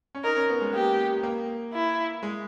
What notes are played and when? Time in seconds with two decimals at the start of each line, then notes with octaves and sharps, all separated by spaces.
0.15 C#4
0.24 D#4 A#4
0.37 C#4
0.50 B3
0.61 G#3
0.73 A#3 G4
1.23 A#3
1.73 E4
2.23 G#3